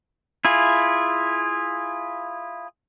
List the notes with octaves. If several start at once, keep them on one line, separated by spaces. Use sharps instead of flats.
E4 F4 G#4